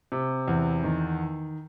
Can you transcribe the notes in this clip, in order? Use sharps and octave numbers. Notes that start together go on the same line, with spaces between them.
C3
E2
D#3